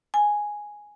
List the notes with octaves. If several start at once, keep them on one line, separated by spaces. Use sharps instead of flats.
G#5